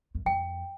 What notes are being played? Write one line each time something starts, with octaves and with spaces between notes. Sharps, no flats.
F#2
F2 G5